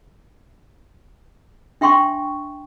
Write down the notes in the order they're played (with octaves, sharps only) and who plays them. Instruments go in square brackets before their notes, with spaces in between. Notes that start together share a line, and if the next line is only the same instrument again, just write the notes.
[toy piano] D4 E5 G5 C6 C#6